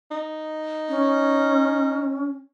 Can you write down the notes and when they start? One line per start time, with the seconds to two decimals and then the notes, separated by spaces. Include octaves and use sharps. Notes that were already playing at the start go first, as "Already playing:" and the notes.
0.11 D#4
0.89 C#4